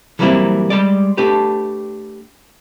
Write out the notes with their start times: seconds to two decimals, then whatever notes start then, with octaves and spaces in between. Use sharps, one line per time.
0.19 E3 F#3 G3 A#3 C4 E4
0.70 G3 G#3 D5
1.17 A3 D4 G4 B4